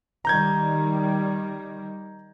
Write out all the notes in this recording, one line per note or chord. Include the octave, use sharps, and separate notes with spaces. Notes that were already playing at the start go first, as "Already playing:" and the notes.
D#3 G3 A#5 G6 G#6